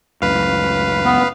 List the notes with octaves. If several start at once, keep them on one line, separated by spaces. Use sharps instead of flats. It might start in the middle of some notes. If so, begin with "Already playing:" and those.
C#2 F#2 A2 B4 F5
B3